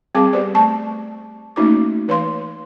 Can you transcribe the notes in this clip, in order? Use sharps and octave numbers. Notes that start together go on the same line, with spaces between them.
G3 C4 G#4 F5 A5 D6
B3 G4 B4 C5 D5
A3 A5 C#6
A3 A#3 C#4 D#4 F#4 D6
E3 B4 C#5 F5 C6